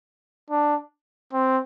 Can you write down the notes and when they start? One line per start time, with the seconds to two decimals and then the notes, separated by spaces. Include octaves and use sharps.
0.50 D4
1.33 C4